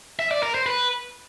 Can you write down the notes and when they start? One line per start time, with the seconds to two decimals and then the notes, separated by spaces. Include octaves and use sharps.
0.19 E5
0.31 D5
0.43 A#4
0.55 C5
0.66 B4